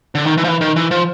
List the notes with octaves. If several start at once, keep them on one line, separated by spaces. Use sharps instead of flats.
D3
D#3
E3
F3
E3
D#3
E3
F3